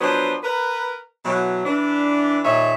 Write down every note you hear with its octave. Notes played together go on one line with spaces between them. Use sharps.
F3 F#3 B3 D4 C5
A#4 B4
B2 E3 F#3
E3 D4
D#2 A#2 C#5 D#5 E5